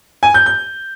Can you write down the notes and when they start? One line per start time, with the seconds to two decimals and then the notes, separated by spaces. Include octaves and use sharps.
0.23 G#5
0.34 G6
0.46 G6